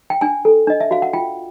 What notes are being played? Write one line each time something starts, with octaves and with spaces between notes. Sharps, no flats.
G5
D4 G#5
A4
D4 D#5
E5
F#4 F5
F#5
F4 G5